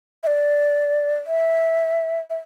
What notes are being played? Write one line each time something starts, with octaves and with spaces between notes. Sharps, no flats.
E5
D5
E5
E5